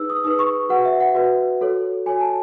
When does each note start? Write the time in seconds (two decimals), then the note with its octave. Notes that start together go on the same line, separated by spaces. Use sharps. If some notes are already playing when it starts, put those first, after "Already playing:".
Already playing: D#4 G#4 B4 E6
0.10 D#6
0.24 D#4 G#4 B4 D#6
0.39 C#6
0.69 F#4 B4 F#5
0.85 E5
1.00 F#5
1.15 F#4 B4
1.61 F#4 A4 C#5
2.06 F#4 A4 C#5 G#5
2.21 A5